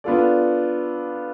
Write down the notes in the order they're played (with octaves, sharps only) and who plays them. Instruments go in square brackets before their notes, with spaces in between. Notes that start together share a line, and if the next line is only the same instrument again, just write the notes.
[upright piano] B3 D4 F4 A4 D5